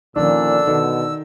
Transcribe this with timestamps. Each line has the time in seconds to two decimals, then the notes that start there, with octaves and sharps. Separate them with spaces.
0.16 A#2 D3 D#3 F3 C#4 D4 E6
0.67 B2 D#3 A4